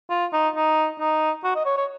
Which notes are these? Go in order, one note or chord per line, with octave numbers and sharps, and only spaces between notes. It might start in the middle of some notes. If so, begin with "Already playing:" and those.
F4
D#4
D#4
D#4
F#4
D#5
C#5
C#5